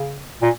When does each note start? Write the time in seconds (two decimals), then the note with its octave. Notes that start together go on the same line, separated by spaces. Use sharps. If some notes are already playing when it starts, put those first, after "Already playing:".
Already playing: C#3
0.42 A#2